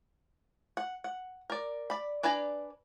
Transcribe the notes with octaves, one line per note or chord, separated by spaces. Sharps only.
F#5
F#5
A#4 D5
D5 B5
D4 B4 D5 G#5 A#5